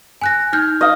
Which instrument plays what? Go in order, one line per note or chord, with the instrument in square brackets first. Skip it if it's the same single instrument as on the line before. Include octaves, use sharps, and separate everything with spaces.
[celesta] G#5 F#6 A#6
D#4 F6 G6
[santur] D#5 F5